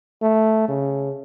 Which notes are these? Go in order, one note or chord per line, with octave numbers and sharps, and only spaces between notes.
A3
C#3